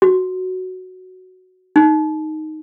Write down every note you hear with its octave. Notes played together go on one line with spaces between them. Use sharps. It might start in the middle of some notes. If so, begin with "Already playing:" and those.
F#4
D#4